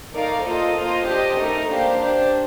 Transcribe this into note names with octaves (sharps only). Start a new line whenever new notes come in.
A3 D#4 A#4 D5 F5
A#3 F4 A4 C5 D#5
A#3 F4 C5 D#5
D4 G4 C5 D#5
A3 D#4 A#4
A#3 D4 G4 C5 F5
D4 G4 C5